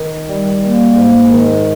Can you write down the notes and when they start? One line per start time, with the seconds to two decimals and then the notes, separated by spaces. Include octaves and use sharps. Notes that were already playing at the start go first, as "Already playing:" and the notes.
Already playing: D#3
0.27 G3
0.62 A#3
0.96 G#2
1.30 D#3